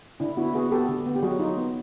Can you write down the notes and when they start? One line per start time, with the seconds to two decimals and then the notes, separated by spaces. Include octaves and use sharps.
0.20 D3 D4 E4
0.37 B3 E4 F#4
0.54 B3 F#4 G#4
0.72 B3 G4 A4
0.89 D3
1.06 B3
1.16 G4
1.22 F#3 F#4 G#4
1.39 F#3 D#4 F4
1.57 B3